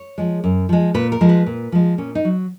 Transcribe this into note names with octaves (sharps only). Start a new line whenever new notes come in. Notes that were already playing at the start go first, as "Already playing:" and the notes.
Already playing: C#5
F3 G#3
F#2
F3 G#3
A#2 B4
A#4
F3 G#3
B4
A#2
F3 G#3
A#2 C#4
D#4
F#3